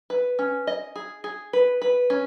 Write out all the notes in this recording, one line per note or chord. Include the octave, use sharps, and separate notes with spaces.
B4
C#4
D#5
G#4
G#4
B4
B4
C#4